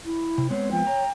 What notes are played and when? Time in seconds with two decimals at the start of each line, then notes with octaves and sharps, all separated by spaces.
0.05 E4
0.38 C3
0.50 G#3 B3 C4 C#5
0.71 F3 G5
0.87 C#5 A#5